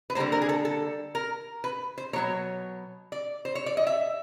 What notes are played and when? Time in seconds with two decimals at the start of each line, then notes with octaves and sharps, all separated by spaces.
0.10 B4
0.15 D3 G3 A#3 C5
0.32 A#4
0.41 G#4
0.49 A4
0.65 A4
1.15 A#4
1.64 B4
1.98 C5
2.13 B2 F#3 A#3 C#5
3.12 D5
3.45 C5
3.55 C#5
3.66 D5
3.77 D#5
3.87 E5